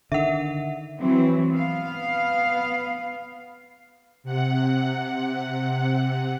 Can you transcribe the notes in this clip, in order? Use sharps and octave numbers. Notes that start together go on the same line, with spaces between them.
D3 D#3 E5 F#5
E3 F#3 C4
B3 F5
C3 F#5